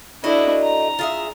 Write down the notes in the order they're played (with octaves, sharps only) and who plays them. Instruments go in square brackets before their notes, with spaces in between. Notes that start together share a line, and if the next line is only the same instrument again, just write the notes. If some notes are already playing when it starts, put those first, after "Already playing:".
[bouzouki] A3 F#4 D#5 [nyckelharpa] D4 E4
[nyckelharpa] A#5
[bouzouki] F4 G#4 E5